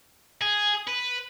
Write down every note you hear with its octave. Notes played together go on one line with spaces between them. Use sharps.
G#4
B4